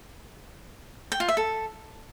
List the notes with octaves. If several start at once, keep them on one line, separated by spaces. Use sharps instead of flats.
G5
F4
E5
A4